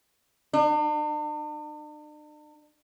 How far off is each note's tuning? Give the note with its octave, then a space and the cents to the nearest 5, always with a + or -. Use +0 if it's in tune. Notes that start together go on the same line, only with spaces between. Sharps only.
D4 +45